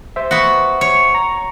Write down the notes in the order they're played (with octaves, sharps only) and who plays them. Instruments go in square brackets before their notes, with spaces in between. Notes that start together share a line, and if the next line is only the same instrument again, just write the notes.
[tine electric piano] C5 E5
[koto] B3 F#4
C#5
[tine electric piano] A#5